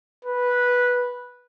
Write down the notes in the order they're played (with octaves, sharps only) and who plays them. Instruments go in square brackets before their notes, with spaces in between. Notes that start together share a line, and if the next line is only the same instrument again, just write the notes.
[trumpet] B4